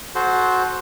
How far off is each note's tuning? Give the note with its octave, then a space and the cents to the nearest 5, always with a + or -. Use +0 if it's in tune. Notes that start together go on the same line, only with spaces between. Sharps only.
F#4 +0 A4 -35 C5 +0